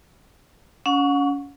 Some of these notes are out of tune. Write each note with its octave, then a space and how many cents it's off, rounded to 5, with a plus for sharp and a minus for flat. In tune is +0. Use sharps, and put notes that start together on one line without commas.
C#4 +25 F#5 -35 C#6 +0